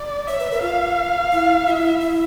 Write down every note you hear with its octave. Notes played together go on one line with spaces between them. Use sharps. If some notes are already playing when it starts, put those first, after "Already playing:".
Already playing: D5
C#5 E5
B4
A#4
F4 F5
E4
E4 F4 E5
E4